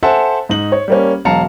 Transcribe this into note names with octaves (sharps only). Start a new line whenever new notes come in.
A4 C5 E5 F#5 G#5 A5
G#2 D#4 F#7
C#5
G3 A#3 C#4
E1 F#3 F5 A5 A#5 C#7